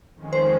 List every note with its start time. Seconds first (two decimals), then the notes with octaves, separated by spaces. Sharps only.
0.14 F2 D#3 G#3 C#4
0.33 C5